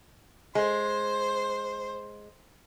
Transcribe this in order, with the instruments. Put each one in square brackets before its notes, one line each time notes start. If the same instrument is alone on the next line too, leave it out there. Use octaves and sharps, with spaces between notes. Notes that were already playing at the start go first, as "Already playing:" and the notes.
[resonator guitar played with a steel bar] G#3 [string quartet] C5